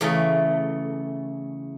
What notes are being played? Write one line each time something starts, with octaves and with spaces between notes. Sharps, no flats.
E2 C#3 A3